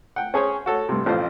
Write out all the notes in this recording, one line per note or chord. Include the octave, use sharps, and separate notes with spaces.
F#5 G5
C#4 G#4 C5 C#5
F#4 A4 C#5
G2 C3
A1 F2 F4 C5